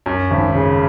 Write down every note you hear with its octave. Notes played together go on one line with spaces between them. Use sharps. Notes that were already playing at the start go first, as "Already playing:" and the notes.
F#2
G#1
C#3